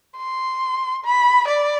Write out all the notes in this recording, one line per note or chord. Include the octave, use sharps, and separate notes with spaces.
C6
B5
D5